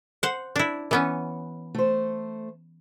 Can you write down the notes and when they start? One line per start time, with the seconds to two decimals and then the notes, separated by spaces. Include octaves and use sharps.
0.23 C5 F#5
0.56 D4 E4
0.91 E3 B3 C#4
1.75 A3 C5